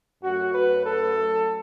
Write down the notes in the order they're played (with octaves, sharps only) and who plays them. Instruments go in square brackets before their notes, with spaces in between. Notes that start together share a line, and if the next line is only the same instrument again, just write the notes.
[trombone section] F#2 F#3 A3 F#4
B4
A4